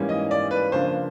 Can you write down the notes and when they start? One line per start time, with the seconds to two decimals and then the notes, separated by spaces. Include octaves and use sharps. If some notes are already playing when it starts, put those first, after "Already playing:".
Already playing: G#2 E3 G3 A#3 C#4
0.09 D#5
0.31 D5
0.51 B4
0.72 C#3 F3 A#3 D4 C5